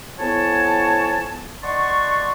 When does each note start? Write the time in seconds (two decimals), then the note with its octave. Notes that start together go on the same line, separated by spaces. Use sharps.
0.19 F2 B3 E4 C#5 G#5 A5
1.63 D5 D#5 F#5 A5 C6 C#6